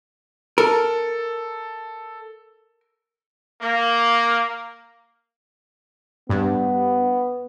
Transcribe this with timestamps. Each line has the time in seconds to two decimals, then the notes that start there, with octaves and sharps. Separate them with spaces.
0.58 A4 A#4
3.62 A#3
6.30 G2 B3